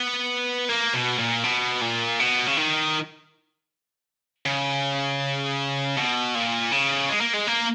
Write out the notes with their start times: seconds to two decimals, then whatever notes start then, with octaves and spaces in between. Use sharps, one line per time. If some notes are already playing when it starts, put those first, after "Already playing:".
Already playing: B3
0.69 A#3
0.94 B2
1.19 A#2
1.44 B2
1.82 A#2
2.20 B2
2.47 C#3
2.57 D#3
4.46 C#3
5.97 B2
6.35 A#2
6.72 C#3
7.10 G#3
7.21 A#3
7.34 G#3
7.48 A#3